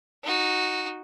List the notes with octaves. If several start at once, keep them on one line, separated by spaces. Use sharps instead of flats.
D#4 F#4